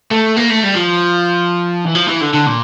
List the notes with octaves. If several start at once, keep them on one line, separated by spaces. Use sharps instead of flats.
A3
A#3
A3
G3
F3
E3
F3
E3
D3
D3
A#2